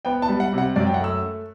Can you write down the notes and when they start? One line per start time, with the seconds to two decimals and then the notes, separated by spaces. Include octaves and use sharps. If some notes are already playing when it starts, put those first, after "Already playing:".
0.05 B3 G5
0.22 A5
0.29 G3
0.40 F#5
0.53 C3 F#5
0.76 F#2 D5
0.86 G5
0.94 F#5
1.00 A3 E6